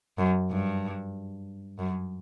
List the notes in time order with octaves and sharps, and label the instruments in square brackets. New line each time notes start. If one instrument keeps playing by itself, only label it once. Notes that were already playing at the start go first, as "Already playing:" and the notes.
[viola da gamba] F#2
G2
F#2